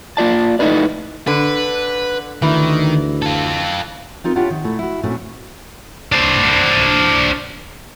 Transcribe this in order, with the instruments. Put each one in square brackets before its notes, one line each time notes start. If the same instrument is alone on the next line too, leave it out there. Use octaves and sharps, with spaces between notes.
[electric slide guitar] A#3 F4 D5 A5
A3 D#4 E4 B4 D5
[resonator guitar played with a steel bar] D3 [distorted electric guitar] B4
[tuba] D2 [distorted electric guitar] D#3 [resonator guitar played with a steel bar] E3
[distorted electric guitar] F4 A4
[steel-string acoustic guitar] C4 D#4 F4 A#4
D4 E4 F4 G4 C#5 F#5
D#3
A#2 A3 E4
E4 F#4
A#2 A3 C4 C#4 E4 F#4
[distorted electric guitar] D4 C5